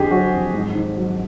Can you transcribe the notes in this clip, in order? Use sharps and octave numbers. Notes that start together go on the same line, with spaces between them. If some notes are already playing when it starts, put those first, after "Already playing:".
Already playing: F2 D3 G4 G#4
F#3 F#4
F2
G#2
D#3
F#3